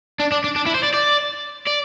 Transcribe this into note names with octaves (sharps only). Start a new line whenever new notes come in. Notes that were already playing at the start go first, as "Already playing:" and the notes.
D4
D4
D4
D4
E4
C5
D5
D5
D5